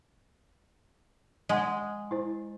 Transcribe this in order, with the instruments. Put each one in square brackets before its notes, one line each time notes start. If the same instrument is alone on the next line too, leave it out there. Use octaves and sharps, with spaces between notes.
[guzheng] G#3 [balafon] D#5 F#5
[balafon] E4 C5